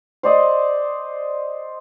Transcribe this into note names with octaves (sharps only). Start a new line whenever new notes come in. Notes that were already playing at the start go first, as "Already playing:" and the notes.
C5 D5 D#5